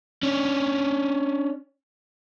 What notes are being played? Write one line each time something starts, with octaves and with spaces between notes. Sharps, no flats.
C#4 D4